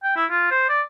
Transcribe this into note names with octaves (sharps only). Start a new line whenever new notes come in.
G5
E4
F4
C5
D5